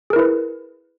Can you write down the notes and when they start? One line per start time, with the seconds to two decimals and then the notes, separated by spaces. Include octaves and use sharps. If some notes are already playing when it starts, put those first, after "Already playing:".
0.10 G#4
0.13 A#4
0.16 E4
0.19 B4